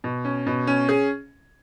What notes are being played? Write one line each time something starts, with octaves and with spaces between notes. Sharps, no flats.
B2
C#4
B2
C#4
G#4